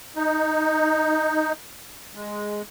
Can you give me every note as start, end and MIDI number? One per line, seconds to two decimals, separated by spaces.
0.16 1.52 63
2.15 2.62 56